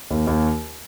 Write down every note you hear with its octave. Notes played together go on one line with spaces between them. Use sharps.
D#2
D#2